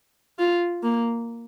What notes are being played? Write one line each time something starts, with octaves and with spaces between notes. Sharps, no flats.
F4
A#3